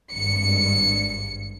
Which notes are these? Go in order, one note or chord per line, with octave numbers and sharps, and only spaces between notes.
G#1 G2 C#7